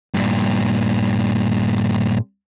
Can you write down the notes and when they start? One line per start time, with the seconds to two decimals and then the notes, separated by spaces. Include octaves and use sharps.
0.14 G2 A#2